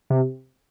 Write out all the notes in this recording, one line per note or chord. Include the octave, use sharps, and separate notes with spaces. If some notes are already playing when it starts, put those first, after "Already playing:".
C3